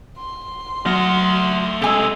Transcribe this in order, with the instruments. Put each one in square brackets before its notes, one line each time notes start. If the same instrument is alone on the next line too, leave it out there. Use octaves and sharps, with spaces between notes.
[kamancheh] C6
[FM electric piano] F#3 F6 A#6 [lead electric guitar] A3 F#5
[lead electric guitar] C3 G#3 [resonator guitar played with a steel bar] A4 G#5